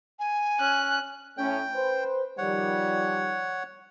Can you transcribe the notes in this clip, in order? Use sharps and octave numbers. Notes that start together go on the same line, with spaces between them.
G#5
C#4 F#6
A2 C#4 G5
B4 C5
D#3 F3 G3 C#5 F#5